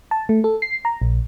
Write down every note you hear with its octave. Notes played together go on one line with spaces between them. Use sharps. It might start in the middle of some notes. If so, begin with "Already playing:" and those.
A5
A3
A4
C7
A#5
A#1